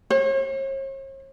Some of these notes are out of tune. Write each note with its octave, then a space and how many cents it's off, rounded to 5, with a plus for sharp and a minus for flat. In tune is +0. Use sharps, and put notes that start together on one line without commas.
C#5 -45